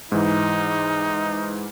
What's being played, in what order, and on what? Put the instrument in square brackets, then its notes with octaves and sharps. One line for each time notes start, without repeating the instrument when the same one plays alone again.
[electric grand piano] G#2 E3 [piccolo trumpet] D#4